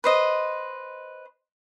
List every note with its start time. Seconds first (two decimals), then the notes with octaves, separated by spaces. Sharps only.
0.04 B4 C5 D#5